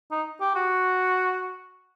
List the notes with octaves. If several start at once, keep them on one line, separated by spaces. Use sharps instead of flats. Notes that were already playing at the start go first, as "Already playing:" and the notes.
D#4
G4
F#4